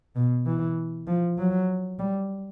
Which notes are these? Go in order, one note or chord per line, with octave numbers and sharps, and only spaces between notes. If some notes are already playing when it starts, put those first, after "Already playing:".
B2
E3
F3
F#3
G3